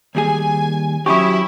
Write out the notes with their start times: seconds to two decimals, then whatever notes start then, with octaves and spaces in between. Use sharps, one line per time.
0.15 D#2 G3 G#4 G#5
1.06 F#3 C#4 E4 G4 C#6 D#6